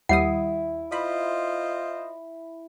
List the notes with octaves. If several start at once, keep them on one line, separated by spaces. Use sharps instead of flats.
D#2 G3 E4 F#5 D#6
F4 C5 D#5 B5